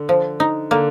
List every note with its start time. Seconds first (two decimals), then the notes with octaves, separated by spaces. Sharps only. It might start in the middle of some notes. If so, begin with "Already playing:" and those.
Already playing: D3
0.09 F3
0.40 D#4
0.71 D3 A#3